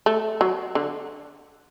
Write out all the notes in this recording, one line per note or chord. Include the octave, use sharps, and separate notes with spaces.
A3
F#3
D3